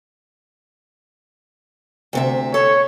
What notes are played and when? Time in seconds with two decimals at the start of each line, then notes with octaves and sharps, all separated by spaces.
2.13 D2 C3 E5
2.54 A4 C#5